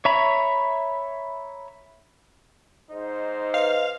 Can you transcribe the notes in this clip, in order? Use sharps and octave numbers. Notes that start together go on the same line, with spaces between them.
C#5 E5 A#5 B5
G#2 D#4 C5
B4 D#5 F5